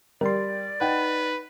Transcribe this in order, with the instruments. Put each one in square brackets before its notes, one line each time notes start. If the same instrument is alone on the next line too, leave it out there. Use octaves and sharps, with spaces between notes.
[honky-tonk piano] G3 [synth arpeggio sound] A#4 C6 [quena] D5
[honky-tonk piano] D#4 [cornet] B4 [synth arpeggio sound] F#5 G5